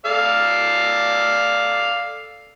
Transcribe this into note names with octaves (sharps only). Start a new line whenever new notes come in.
A4 D5 F5